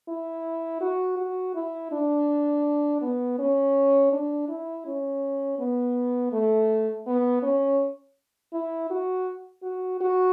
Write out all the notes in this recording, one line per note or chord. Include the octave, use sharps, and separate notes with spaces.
E4
F#4
F#4
E4
D4
B3
C#4
D4
E4
C#4
B3
A3
B3
C#4
E4
F#4
F#4
F#4